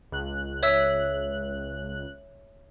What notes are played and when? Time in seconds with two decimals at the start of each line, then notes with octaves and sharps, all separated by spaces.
0.12 C#2 F#6
0.63 C#5 E5 E6